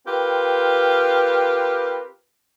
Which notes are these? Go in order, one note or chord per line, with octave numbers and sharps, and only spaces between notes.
C4 F4 G4 A#4 B4